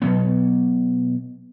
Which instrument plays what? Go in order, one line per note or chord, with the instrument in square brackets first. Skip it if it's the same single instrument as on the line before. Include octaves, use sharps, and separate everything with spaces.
[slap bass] B2 F#3 B3